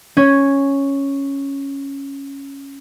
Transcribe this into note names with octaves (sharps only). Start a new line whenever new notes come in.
C#4 G#6